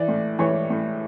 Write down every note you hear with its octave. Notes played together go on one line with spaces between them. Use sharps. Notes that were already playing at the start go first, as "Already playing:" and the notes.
Already playing: E3 D5
A2
E3 C#5
A2